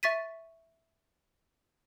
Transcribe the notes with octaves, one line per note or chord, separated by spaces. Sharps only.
E5 C#6 A6 B6 D#7